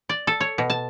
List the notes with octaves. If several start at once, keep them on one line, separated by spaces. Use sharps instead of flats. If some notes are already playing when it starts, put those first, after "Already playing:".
D5
A4
C#5
B2
A5